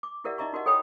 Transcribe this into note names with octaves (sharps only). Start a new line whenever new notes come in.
D6
E4 G4 A#4 D5 E5 F#5
D#4 D#5 E5 A#5 C#6
D#4 F#4 A#4 D#5 F#5
A4 C#5 G5 B5 D#6